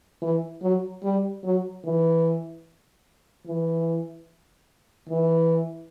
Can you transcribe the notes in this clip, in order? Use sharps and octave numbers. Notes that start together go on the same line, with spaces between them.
E3
F#3
G3
F#3
E3
E3
E3